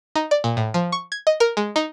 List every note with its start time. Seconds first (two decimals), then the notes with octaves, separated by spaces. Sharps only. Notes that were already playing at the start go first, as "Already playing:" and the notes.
0.15 D#4
0.31 D5
0.44 A#2
0.57 A2
0.74 F3
0.92 C#6
1.12 G#6
1.27 D#5
1.40 A#4
1.57 G#3
1.76 D#4